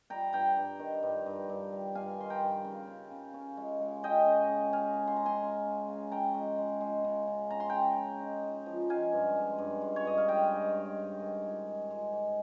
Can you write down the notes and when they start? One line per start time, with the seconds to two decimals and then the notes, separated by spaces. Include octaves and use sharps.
0.10 G3 G5 A#5
0.33 G2 G5 A#5
0.57 G2
0.79 D#3
1.03 G2
1.26 G2
1.49 G2
1.72 G3
1.95 G2 F5 G#5
2.19 D#3 C6
2.30 G5 A#5
2.41 G2
2.65 C#3
2.88 C#3
3.11 C#3
3.34 C#4
3.57 G#3
3.80 G#3
4.03 C#4 D#5 G5
4.27 C#3
4.50 C#3
4.73 G#3 F5 G#5
4.96 C#3
5.07 C6
5.16 G#3 A#5
5.26 G#5 C6
5.42 C#4
5.65 C#3
5.89 C#3
6.11 C#4 G5 A#5
6.34 G#3
6.58 G#3
6.81 G#3
7.04 C#3
7.27 C#3
7.50 C#4 A#5
7.60 C6
7.69 C#3 G5 A#5
7.97 C#4
8.19 D#4
8.43 G#3
8.66 F3
8.89 G#3 F5 G#5
9.12 G2
9.36 G#3
9.59 G2
9.82 G#3
9.96 C#5
10.05 G2 D#5
10.18 F5
10.28 G#3 D#5 G5
10.51 G2
10.74 G2
10.97 G#2
11.20 D#3
11.44 G#3
11.67 G#2
11.90 G#3
12.13 G#2